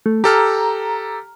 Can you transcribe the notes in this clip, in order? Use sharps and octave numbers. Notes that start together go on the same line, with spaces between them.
A3
G4 A4 A#5 F6